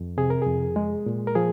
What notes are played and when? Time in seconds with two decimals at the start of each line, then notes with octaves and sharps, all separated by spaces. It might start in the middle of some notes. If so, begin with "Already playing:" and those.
Already playing: F2
0.18 C3 G#4
0.30 A#4
0.42 F2 G#4
0.76 G#3
1.06 A#2
1.27 A#4
1.35 F3 G#4